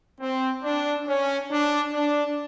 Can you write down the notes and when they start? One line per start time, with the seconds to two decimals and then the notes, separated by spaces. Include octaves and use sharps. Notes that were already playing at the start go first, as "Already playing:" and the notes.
0.20 C4
0.64 D4
1.07 C#4
1.50 D4
1.92 D4